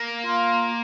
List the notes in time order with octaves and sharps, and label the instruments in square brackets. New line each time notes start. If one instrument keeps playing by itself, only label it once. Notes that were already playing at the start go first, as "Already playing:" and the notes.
Already playing: [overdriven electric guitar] A#3
[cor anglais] F4